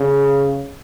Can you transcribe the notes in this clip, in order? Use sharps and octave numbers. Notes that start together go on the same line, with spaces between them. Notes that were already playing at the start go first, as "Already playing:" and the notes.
Already playing: C#3